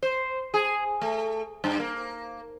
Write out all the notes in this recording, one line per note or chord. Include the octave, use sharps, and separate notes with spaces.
C5
G#4
A3
G2
A#3